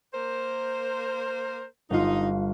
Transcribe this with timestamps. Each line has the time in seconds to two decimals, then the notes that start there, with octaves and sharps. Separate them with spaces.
0.14 A#3 A#4 C5
1.91 G1 D#4 F4